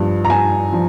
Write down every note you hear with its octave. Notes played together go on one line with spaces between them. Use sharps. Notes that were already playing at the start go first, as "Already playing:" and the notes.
Already playing: G2 F3
A#5
G2 G#5
F3